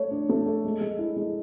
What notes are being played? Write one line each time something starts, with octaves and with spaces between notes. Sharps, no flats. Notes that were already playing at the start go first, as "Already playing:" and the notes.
Already playing: A3 C#5
D4
A3
A4
G#3
G#3
E4
G#3